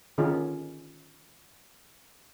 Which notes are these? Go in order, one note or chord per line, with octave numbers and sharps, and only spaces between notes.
D3 D#3 C#4 D#4 F4 G#4